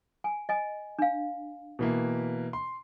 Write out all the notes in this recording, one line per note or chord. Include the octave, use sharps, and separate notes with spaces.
G#5
D#5 G#5
D4 F5
B2 E3 A#3
C6